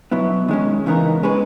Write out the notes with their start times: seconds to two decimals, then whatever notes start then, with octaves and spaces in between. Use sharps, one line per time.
0.11 B2 F#3 B3 E4
0.48 D#3 G#3 C#4
0.86 C#3 E3 B3 D#4 A#4
1.23 G#3 C#4 G#4 B4